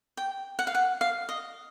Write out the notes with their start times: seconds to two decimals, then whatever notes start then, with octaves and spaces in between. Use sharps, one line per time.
0.17 G5
0.59 F#5
0.67 F5
0.75 F#5
1.01 F5
1.29 D#5